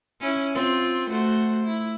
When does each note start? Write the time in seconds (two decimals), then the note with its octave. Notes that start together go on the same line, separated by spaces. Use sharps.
0.21 C#4 E4
0.54 C4 F4
1.11 A3 F#4 C5
1.65 E4